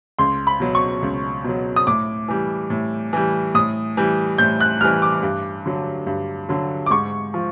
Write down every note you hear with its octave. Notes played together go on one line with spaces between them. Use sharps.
C#2 C6
B5
B2 F#3
C#6
C#2
B2 F#3
D#6
A2 D6
E3 G3
A2
E3 G3
A2 D#6
E3 G3
A2 G6
F#6
E3 G3 F6
D6
G2
D3 F#3
G2
D3 F#3
D6
G#2 C#6
F3